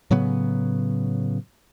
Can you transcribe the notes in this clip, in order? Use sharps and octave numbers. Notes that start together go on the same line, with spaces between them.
A2 C#3 F#3 B3